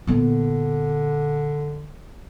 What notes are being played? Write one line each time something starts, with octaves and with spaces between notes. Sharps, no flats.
A#2 D3 B3